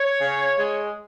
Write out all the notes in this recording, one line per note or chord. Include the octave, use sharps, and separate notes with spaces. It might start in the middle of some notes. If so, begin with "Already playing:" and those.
Already playing: C#5
C#3
G#3